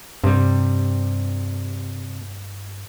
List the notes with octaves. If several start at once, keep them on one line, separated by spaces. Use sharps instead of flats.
G2 C3 G3